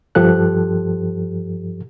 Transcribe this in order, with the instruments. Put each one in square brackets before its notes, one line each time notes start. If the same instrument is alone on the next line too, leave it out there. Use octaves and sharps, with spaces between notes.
[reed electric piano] G2 F3 G4 A4 F#6